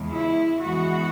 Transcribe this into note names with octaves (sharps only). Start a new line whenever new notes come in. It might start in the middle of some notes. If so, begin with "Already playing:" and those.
Already playing: E2 C#3 E3 G#3
E4
E2 E3 G#3 B3 F#4